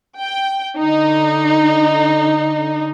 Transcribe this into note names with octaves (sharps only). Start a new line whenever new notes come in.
G5
D3 D#4